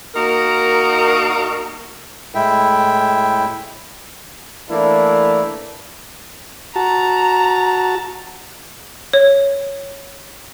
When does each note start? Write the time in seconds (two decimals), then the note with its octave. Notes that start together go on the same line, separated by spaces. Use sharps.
0.15 A#3 D#4 F#4 A#4
2.35 A2 G#3 E4 E5 G5
4.70 E3 A3 A#3 D4 E4
6.76 F#4 A5 A#5
9.13 C#5